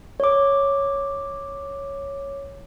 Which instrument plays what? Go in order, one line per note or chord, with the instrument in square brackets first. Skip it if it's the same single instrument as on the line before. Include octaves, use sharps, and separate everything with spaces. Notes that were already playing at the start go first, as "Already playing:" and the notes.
[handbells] C#5 D6